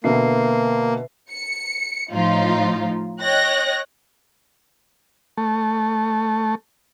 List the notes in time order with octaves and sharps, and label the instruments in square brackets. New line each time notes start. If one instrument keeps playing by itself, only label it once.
[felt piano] B2 D3 [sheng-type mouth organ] A#3 [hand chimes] B4 E5 C7
[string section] C#7
A2 F3 D#4 F4
C#5 D#5 G5 F#6 A#6
[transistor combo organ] A3